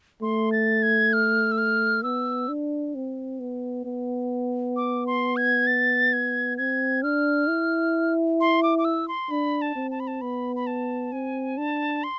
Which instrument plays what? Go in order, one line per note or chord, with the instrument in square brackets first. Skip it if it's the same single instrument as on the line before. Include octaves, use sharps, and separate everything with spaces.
[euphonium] A3 [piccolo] C6
[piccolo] A6
G#6
F6
E6
F6
[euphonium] B3 [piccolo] E6
[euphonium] D4
C4
B3
B3
[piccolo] D6
C6
G#6
A6
G#6
[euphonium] C4 [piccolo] G#6
[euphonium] D4 [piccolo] F6
[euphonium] E4
[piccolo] C6
D6
D6
E6
C6
[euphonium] D4 [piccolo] B5
[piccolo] A5
[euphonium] C4
[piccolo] A5
B5
A5
[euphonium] B3 [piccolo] B5
[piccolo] B5
A5
[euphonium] C4 [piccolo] G#5
[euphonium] D4 [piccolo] A5
[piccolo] C6